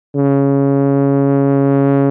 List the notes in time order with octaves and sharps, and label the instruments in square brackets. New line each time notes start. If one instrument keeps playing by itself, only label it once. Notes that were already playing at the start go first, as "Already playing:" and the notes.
[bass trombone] C#3